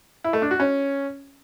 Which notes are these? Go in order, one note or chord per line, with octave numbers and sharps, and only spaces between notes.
E4
A3
D4
F#4
C#4